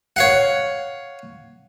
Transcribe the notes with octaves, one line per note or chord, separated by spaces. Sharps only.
C#5 F5 F#5